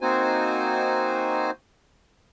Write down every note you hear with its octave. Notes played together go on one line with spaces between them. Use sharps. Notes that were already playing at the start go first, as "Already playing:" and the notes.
A#3 C4 D#4 F#4 C5 G#5